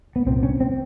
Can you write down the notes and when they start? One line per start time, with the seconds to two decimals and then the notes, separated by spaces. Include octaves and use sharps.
0.16 B3
0.26 C2 A#2 C4
0.43 C#4
0.61 C4